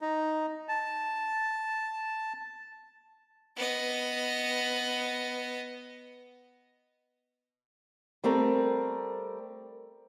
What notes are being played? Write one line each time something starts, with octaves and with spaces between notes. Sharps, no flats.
D#4
A5
B3 D#5
G3 A3 C4 A#4